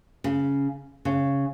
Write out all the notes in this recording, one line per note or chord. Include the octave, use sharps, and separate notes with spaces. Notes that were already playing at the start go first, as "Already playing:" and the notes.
C#3
C#3